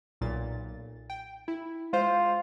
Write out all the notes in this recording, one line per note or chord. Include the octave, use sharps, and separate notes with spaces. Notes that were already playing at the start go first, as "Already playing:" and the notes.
B1 A#2 A6
G5
E4
G#3 F4 C5